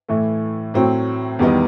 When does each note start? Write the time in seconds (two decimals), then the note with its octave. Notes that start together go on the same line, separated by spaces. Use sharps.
0.09 A2 E3 A3
0.74 A2 F#3 C4
1.39 E2 D#3 G3 B3 D#4